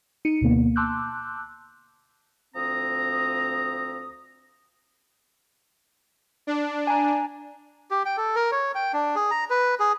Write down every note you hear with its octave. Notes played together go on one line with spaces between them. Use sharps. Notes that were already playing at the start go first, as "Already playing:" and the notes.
D#4 C#7 D#7
D2 B2 D3 A#3 B3
A5 C6 D6 E6 F#6 G6
D2 F3 C4 A#5 D#6
D4
G#5 A#5
G4
G5
A4
A#4
C#5
G5
D4
G#4
A#5
B4
G#4